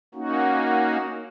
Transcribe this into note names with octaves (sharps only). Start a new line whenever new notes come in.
A#3 C#4 D#4 F#4